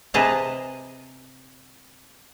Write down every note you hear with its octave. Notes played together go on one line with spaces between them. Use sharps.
C3 G#4 B4 D#5 A5 A#5